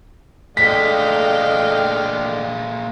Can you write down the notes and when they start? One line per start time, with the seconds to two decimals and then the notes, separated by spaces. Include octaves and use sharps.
0.57 A#2 G#3 A3 D4 D#5 F5 G5 B6